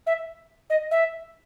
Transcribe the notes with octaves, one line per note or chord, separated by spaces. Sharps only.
E5
D#5
E5